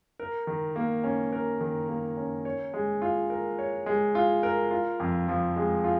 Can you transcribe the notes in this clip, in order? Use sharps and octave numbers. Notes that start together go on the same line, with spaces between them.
A#4
D#3
A#3
C#4
A#4
D#3
A#3
C#4
C#5
G#3
F4
A#4
C#5
G#3
F4
A#4
F4
F2
F3
G#3
F4